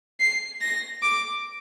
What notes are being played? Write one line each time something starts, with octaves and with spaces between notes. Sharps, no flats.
C7
A#6
D6